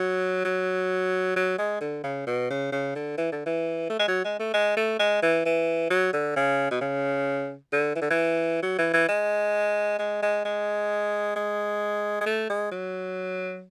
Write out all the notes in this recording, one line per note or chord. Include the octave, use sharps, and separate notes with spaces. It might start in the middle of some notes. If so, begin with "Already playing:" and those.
Already playing: F#3
F#3
F#3
G#3
D3
C#3
B2
C#3
C#3
D3
E3
D3
E3
A3
G#3
F#3
G#3
A3
G#3
A3
G#3
E3
E3
F#3
D3
C#3
B2
C#3
D3
E3
D3
E3
F#3
E3
E3
G#3
G#3
G#3
G#3
G#3
G#3
A3
G#3
F#3